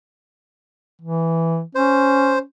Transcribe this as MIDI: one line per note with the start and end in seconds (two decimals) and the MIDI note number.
1.02 1.62 52
1.75 2.42 61
1.75 2.39 72